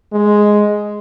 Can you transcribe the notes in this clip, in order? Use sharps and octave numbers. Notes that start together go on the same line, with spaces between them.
G#3